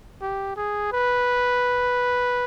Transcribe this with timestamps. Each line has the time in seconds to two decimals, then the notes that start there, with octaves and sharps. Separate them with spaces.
0.21 G4
0.56 G#4
0.92 B4